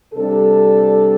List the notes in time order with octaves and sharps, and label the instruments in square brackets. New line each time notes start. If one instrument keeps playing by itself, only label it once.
[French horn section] C3 G3 D4 A4